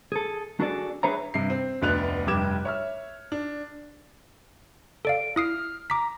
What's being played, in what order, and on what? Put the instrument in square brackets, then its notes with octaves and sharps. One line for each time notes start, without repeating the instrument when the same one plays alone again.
[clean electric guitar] G#4 A4
D4 F#4 G#4 A4 C#5 D5
D4 G#4 B4 C#5 E5 A#5
[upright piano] G2 C3 C7
C4
F1 D2 B3 D4 F#6 F7
F1 G2 G4 D6 G#6 E7
C#5 E5 F6
D4
[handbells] A4 D5 F5 [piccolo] D7
[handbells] E4 D#6 C7 [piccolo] F6
[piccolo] A#5 [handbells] D6 B6